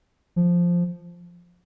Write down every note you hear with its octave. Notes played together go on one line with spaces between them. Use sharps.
F3